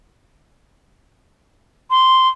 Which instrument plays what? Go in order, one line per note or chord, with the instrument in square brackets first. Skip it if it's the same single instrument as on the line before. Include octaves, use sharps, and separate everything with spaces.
[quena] C6